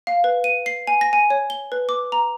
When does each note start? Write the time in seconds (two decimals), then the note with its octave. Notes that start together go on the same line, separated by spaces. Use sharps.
0.07 F5
0.24 B4
0.44 D#7
0.66 C7
0.87 G#5
1.01 A#6
1.13 G#5
1.30 C#5
1.50 G7
1.72 B4
1.89 D6
2.12 A#5